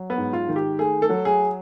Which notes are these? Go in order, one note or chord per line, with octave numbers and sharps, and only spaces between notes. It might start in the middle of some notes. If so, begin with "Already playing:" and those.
Already playing: F#3
B3
G#2
F4
D#3
G4
A3 G#4
A4
F#3
G#4